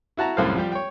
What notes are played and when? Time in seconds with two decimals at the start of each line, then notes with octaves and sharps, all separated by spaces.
0.17 E4 F#4 A5 A#5
0.37 C2 F#2 A2 A4 C5 F5
0.55 F3 G3 G4
0.72 C#5 G5